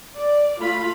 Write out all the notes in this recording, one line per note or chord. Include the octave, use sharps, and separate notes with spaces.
D5
A3 F4 B5